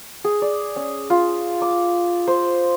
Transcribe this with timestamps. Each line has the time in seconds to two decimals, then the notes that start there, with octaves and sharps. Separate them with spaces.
0.24 G#4
0.42 D5
0.76 C#4
1.10 F4
1.62 D6
2.28 C5